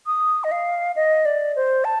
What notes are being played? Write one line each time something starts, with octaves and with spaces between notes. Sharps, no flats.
D#6
D#5
F5
D#5
D5
C5
A5